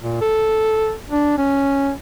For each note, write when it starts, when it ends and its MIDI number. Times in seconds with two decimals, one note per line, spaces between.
0.02 0.17 46
0.21 0.92 69
1.10 1.35 62
1.38 1.91 61